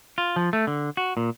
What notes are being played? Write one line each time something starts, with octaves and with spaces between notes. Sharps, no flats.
F4
F3
A3
D3
F#4
A#2